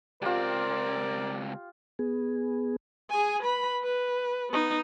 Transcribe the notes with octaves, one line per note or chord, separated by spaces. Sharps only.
C#2 C4 F4 G4 A#4 D5
B3 G#4
G#4 G#5
B4 B5
B4
B3 D#4